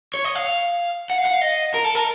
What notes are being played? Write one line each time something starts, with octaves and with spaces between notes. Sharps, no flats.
C#5
D#5
F5
F#5
F5
F#5
F5
D#5
A#4
A4
A#4